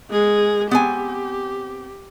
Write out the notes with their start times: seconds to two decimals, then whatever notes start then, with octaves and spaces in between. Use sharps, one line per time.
0.11 G#3 G#4
0.71 B3 C4 G4 G#5